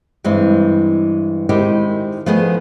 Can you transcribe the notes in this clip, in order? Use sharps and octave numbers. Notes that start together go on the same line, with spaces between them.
G2 E3 G#3 C4
D#3 G#3 C4 E4 G4
F3 A3 B3 F4 G#4 D#5